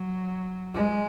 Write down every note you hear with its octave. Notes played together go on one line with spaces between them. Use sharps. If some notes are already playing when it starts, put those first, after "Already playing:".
Already playing: F#3
G#3